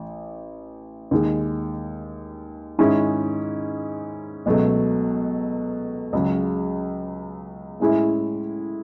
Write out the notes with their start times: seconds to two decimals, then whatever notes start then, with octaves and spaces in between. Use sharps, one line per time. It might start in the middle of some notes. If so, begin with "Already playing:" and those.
Already playing: A1
1.11 D#2 D#3 G#3
2.78 G#2 D#3 G#3 C#4 E4
4.46 C#2 B2 F#3 A3
6.13 C#2 C#3 F#3
7.80 A2 G#3 C#4 E4